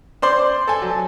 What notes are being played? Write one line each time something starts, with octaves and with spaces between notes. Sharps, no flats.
C5 D5 C6
A4 G#5
F#3